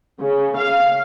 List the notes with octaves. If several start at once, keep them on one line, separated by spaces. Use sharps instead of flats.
C#3
F5